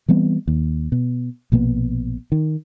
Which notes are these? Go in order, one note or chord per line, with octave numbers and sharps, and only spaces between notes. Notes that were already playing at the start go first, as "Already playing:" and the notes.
E3 G3 B3 C4
D#2
B2
A#1 B2 A#3 B3
D#3